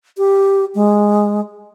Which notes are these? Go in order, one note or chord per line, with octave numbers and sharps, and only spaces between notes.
G4
G#3